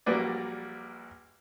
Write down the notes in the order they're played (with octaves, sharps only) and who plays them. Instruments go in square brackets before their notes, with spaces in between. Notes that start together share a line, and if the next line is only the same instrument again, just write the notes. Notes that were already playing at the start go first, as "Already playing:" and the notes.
[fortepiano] A#1 F#3 G3 A#3 B4 D5